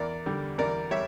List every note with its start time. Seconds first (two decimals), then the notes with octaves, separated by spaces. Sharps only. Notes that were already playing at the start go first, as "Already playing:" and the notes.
Already playing: E2 A#4 D5
0.26 D3 G3
0.58 E2 A#4 D5
0.91 G3 C#5 E5